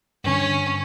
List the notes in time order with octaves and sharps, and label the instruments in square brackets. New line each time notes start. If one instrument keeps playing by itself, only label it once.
[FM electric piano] G2 D3 [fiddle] C#4